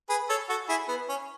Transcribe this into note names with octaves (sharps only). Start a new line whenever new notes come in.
G#4 B4
A4 C#5
F#4 A4
E4 G#4
B3
C#4